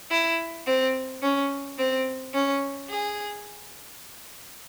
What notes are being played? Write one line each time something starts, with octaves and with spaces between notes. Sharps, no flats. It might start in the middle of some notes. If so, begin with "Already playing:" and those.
E4
C4
C#4
C4
C#4
G#4